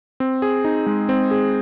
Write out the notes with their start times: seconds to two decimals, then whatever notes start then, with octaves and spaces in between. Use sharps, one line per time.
0.20 C4
0.42 G#4
0.65 D#4
0.87 G#3
1.09 C4
1.31 G#4